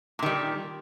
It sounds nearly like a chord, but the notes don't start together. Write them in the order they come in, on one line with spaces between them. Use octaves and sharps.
A#2 D#3 G3